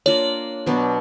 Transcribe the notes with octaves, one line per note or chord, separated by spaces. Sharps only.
A#3 D4 F4 A#4 C#5
B2 F#3 B3 D4